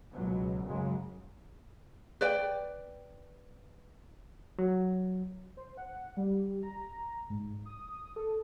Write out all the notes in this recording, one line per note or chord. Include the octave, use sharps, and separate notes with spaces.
C#2 B2 F#3
F#2 C#3 F#3 G#3
B4 D5 G5
F#3
C5
F#5
G3
A#5
G#2
D#6
A4